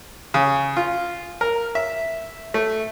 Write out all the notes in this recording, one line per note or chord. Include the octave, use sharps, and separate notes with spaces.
C#3
F4
A#4
E5
A3